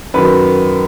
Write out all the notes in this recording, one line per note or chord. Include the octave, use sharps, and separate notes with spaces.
F#2 D#3 F#3 B4